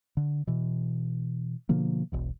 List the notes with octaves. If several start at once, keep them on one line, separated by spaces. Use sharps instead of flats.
D3
B2 E3
B2 D3 F3 A#3
E1 B1 E2